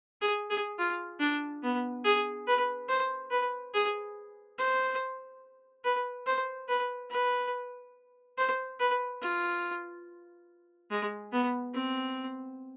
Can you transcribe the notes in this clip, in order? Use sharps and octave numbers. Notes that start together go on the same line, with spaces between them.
G#4
G#4
F4
D4
B3
G#4
B4
C5
B4
G#4
C5
B4
C5
B4
B4
C5
B4
F4
G#3
B3
C4